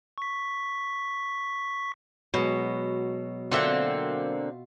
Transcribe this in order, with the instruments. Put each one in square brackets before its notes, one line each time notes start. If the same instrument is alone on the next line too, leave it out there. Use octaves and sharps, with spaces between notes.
[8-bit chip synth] C#6 B6
[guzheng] B2 [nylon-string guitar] F#3 G#3
[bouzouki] D3 A#3 C4 [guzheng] F4 E5 F#5